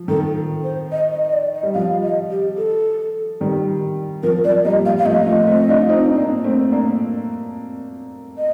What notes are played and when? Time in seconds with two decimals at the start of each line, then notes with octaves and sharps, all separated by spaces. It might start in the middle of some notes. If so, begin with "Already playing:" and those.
Already playing: F3
0.08 D#3 A4
0.64 C5
0.92 D#5
1.12 D#5
1.24 D#5
1.33 D5
1.54 D#5
1.63 G3
1.74 F3 F5
2.02 D#5
2.30 G4
2.57 A4
3.41 D#3 G3
4.23 F3 A#4
4.44 F3 D5
4.65 G3 A#3 D#5
4.85 F3 F5
4.98 F5
5.06 F3 A3 D#5
5.26 F3 A3
5.47 A3 C4
5.69 D4 F4
5.89 C4 D#4
6.05 D#4
6.16 A#3 D4
6.44 A3 C4
6.72 A#3 D4
8.38 D#5